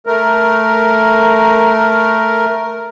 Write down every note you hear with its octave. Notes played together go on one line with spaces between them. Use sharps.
A3 A#4